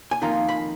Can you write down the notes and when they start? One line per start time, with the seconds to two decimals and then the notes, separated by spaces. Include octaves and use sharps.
0.11 G#5
0.22 F2 D#3 A#3 F4 A#5
0.49 B5